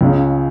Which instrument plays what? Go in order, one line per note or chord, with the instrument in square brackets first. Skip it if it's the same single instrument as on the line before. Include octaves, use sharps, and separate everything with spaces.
[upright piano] C#2 C#3 G#3 C#4 G#4